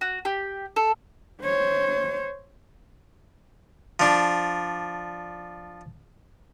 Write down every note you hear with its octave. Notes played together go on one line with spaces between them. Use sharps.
F#4
G4
A4
C5 C#5
F3 D4